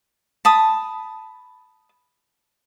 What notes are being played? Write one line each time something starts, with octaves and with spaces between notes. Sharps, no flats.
A5 B5 D#6